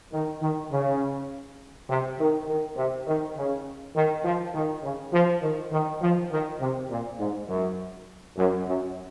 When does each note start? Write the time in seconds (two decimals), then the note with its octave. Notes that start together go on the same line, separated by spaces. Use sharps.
0.13 D#3
0.41 D#3
0.71 C#3
1.89 C3
2.19 D#3
2.48 D#3
2.77 C3
3.07 D#3
3.36 C#3
3.95 D#3
4.24 F3
4.54 D#3
4.83 C#3
5.12 F3
5.42 D#3
5.71 D#3
6.02 F3
6.31 D#3
6.60 C3
6.90 A#2
7.19 G#2
7.48 F#2
8.37 F#2
8.66 F#2